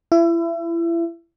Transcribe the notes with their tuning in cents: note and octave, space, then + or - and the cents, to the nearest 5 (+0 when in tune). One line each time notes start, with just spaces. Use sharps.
E4 +30